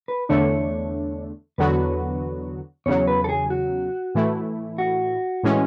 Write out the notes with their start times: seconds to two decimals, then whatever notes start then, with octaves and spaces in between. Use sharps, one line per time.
0.08 B4
0.29 E2 D3 A3 D4 C#5
1.58 E2 D3 F#3 B3 F#4 B4
2.86 E2 C#3 F#3 C#5
3.07 B4
3.24 A4
3.29 G#4
3.50 F#4
4.15 A2 E3 A3 E4
4.78 F#4
5.43 A2 E3 G#3 C#4